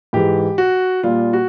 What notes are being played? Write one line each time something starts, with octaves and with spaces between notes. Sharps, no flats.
G#2 E3 G#3 G4
F#4
A#2 G3 F4
F#4